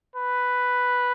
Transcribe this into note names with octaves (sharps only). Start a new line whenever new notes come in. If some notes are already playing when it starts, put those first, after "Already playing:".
B4